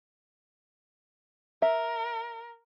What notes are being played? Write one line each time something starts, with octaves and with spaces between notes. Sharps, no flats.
A#4 E5